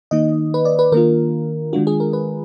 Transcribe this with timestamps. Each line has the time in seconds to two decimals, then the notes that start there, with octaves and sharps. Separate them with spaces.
0.11 D#3 A#3 D#4 D#5
0.54 B4
0.65 D5
0.79 B4
0.92 D#3 A#3 D4 F4 A#4
1.73 D#3 G#3 D4 F4 F#4
1.87 G#4
2.00 A#4
2.13 B4